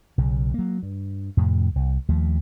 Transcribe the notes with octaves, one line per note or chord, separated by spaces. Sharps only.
B1 C#3
F#3 A#3
G2
F2 A2 C3
C2
D#2 F3 A3